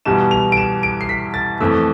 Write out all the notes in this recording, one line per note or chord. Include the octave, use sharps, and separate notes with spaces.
E2 B2 G3 B3 E7
F7
D7
E7
D7
C7
B6
A6
F2 E3 A3 E6